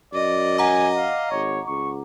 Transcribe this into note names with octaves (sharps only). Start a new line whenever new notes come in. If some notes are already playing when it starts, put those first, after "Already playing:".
F#2 D5 D#5
F#5 G#5 A#5 D6
F5
G#1 C#5
C#2 C#6